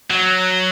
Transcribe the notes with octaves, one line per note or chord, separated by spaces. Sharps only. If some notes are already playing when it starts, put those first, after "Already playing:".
F#3